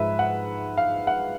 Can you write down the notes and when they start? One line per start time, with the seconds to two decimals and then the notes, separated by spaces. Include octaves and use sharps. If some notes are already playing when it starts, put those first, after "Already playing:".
Already playing: G#2 F3 G#3 B4 E5
0.19 F#5
0.77 F5
1.07 F#5